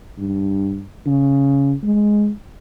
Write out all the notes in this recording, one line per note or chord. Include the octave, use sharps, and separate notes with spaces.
G2
C#3
G#3